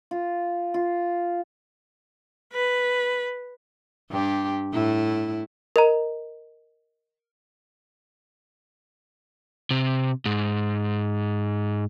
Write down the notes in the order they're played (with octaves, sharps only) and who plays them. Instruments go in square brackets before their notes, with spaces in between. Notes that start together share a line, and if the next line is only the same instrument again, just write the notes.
[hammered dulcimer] F4
F4
[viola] B4
[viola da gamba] G2 G4
A2 E4
[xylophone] A#4 D#5 A#5
[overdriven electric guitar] C3
G#2